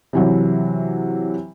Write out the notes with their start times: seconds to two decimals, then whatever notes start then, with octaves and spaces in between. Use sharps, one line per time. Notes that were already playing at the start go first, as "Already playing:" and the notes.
0.13 C3 E3 F#3